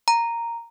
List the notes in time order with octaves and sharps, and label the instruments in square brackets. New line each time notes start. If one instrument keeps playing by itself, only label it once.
[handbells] A#5